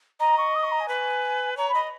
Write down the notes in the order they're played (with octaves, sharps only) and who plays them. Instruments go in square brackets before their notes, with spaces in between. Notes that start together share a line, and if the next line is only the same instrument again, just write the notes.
[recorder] D#5 [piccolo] A#5
[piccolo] C#6
D#6
C#6
A#5
G#5
[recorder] B4
[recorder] C#5 [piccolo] A#5
[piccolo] B5
[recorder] D#5